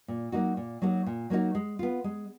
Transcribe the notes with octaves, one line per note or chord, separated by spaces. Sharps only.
A#2
F#3 A#3 D#4 F#4
A#2
F#3 A#3 D#4 F#4
A#2
F#3 A#3 D#4 F#4
G#3
B3 F4
G#3